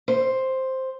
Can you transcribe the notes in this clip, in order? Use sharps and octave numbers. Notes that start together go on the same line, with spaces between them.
C5